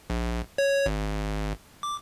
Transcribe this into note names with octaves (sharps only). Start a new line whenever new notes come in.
A#1
C#5
G#1
D6